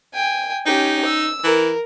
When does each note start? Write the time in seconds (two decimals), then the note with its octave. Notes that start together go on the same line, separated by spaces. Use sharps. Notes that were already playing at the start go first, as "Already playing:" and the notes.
0.14 G5 G#5
0.66 C#4 D#4 G4
1.05 E6
1.44 E3 A#4